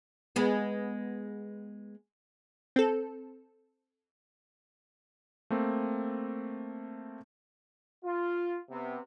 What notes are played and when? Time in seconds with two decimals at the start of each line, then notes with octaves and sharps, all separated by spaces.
0.36 G#3 B3
2.76 C4 A4
5.50 A3 A#3 C4
8.05 F4
8.70 C3 B3